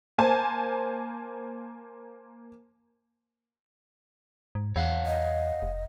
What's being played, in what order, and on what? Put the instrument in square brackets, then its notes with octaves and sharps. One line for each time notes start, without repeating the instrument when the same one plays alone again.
[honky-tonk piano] A#3 C5 G#5 A5
[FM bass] G#2
[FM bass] E2 [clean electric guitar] C#5 F5 F#5
[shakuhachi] D#5
[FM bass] F1